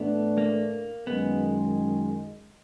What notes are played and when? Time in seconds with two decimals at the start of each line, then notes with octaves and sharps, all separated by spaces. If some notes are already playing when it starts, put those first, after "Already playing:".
Already playing: A2 E3 A3 B3 D4
0.38 A#3
1.07 F#2 D#3 G#3 B3